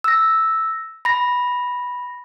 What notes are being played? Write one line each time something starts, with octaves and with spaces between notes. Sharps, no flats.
E6 A#6
B5 A#6